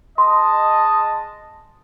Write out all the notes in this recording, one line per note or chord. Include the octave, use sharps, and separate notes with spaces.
G#3 D#5 A5 C6